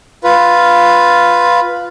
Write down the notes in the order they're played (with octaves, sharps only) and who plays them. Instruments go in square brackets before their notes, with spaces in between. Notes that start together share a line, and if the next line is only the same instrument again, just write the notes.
[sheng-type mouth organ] F4 B4